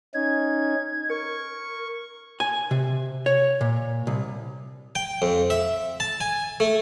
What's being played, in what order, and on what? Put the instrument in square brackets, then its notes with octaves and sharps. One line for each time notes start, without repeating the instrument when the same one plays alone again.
[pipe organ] C#4 D#4 [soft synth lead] G#6
[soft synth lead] A#4 [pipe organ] C#6
[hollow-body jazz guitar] G#5
C3
C#5
A#2
C2
[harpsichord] G5
F2
E5
A5
G#5
A3